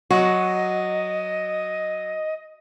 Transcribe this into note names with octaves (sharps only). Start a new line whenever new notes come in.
F#3 F#4 D#5